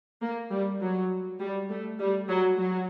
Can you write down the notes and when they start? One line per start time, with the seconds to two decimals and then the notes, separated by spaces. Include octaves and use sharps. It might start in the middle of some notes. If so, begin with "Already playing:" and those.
0.22 A#3
0.51 G3
0.81 F#3
1.40 G3
1.70 A3
1.99 G3
2.28 F#3
2.58 F#3